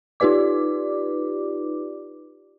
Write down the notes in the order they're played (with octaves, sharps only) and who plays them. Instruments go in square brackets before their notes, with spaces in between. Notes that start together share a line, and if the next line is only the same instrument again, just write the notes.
[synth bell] D#4 F4 G4 B4 D5 D6